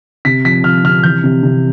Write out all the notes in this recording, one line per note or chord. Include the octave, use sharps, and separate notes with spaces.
C3 B6
F3 B6
F3 F6
C3 F6
E3 G6
C3
C3